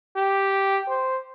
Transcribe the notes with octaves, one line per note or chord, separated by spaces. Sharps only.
G4
C5